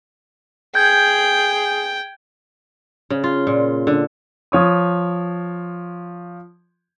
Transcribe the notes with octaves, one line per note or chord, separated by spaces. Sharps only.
G#4 G5 G6 G#6
C#3
F4
A#2
D3
F3 C#5 D#6